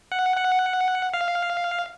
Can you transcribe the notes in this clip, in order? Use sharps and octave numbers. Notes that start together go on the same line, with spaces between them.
F#5
F#5
F5